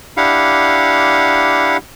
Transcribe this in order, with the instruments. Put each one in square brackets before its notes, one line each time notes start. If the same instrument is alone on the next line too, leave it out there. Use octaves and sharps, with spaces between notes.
[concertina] D4 E4 G4 F5 F#5